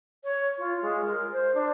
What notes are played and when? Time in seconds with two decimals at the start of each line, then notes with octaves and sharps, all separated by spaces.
0.24 C#5
0.58 F4
0.82 G#3
1.05 A#4
1.32 C5
1.55 D4